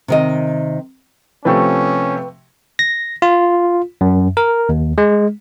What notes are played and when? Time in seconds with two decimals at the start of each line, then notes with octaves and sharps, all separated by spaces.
0.08 C3 D#3 D#5
1.45 C3 F3 A3 C#4 B4 G5 C#6
2.79 A#6
3.22 F4
4.01 F#2
4.37 A#4
4.69 D#2
4.98 G#3